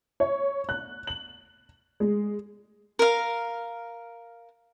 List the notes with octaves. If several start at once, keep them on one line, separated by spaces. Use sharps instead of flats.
C#5
F#6
F#7
G#3
A#4 F5